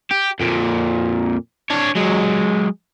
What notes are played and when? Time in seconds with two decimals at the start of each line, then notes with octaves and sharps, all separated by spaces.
0.11 G4
0.40 F2 A#2
1.70 D4 C#5
1.95 F#3 G#3